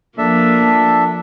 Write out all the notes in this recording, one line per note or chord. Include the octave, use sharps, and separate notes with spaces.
F3 A#3 D4 A4 E5